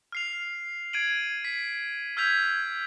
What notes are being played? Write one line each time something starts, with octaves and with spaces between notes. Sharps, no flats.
F6 C7 F7
G#6 C7 D7 D#7 F#7
B6
E6 F6 G6 G#6 B6 F7